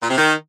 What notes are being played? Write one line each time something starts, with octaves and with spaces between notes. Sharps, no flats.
A#2
C3
D#3